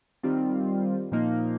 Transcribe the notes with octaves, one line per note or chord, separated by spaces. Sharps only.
D#3 G3 C4 F4
A#2 F3 A#3 D#4